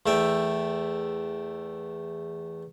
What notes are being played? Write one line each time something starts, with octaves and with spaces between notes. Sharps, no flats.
E2 A3 E5 G5